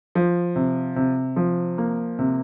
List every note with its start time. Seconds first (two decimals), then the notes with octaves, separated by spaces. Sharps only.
0.15 F3
0.56 C3
0.96 C3
1.36 F3
1.78 A#3
2.19 C3